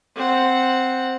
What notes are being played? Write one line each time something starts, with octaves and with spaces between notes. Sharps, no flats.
C4 F#5